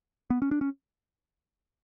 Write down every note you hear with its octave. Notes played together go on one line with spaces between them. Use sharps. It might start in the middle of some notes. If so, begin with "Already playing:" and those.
B3
C#4
D4
C#4